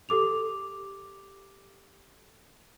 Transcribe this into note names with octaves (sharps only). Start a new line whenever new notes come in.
G4 A4 D6 F7